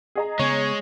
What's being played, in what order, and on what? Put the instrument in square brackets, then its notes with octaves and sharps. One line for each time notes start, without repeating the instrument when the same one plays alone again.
[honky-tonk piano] G#4 D#5 A#5
[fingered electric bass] C#3 B3 [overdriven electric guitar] G#3 [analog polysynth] C#5